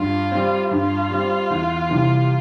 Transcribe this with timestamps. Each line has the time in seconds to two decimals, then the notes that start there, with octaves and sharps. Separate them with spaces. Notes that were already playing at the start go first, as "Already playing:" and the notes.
Already playing: G2 F4
0.32 G3 C4
0.71 G2 F4
1.10 G3 C4
1.50 E2
1.89 C3 E3 G3